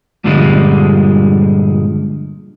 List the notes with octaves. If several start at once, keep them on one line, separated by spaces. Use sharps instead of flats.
G2 A#2 D3 F3 G3 G#3